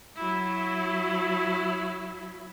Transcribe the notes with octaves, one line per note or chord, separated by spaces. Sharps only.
F#3 E4